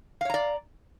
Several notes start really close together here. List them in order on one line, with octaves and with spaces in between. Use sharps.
F5 C#5 A#5 D5